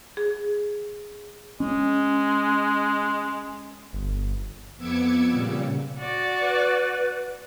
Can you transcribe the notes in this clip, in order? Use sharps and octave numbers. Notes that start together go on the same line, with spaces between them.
G#4
G#3 C#4
G1
F2 B3 D6 E6 G#6 C#7
A#2 C#3 G3
F#4 D5
B4